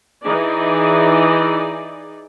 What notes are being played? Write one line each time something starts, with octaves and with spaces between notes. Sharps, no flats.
E3 D#4 G#4 D5